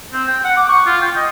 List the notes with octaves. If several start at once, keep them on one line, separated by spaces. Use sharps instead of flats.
C4
G5
F#5
D6
C#6
F4
G5
D#5